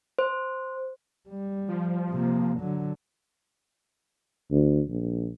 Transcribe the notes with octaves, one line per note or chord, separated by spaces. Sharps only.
C5
G3
F3
C3 A#3
D3 F#3
D2
A#1